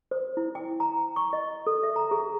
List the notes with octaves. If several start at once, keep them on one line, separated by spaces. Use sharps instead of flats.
C5
E4
G5
A#5
C#6
D#5
A4
E5
A#5
G#4